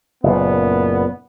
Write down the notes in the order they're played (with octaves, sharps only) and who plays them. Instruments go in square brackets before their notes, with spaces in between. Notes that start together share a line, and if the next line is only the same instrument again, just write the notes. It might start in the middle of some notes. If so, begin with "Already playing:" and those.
[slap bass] F#1 A#2 [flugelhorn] B3